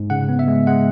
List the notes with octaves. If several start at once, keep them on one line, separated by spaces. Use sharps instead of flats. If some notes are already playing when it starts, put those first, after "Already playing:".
Already playing: G#2
C#3 F#5
B3
E5
G#3
G#3 F#5